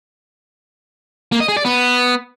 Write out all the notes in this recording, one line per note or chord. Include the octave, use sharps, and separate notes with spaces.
A#3
D#5
G#4
D5
B3